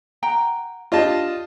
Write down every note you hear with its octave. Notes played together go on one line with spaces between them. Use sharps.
F#5 G5 A#5
D4 F4 G4 D5 D#5 A5